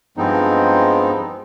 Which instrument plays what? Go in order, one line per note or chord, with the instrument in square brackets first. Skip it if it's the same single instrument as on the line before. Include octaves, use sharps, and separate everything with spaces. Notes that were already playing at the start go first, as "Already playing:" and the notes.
[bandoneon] G2 F3 G#3 B3 C4 D#4